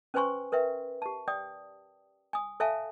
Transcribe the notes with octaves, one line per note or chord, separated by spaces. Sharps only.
C#4 B4 C5 G#5 C6 C#6
A#4 B4 E5 G5
G4 A5
D5 G5 D#6
G#5 D#6
A4 C#5 E5 F5 G#5 A5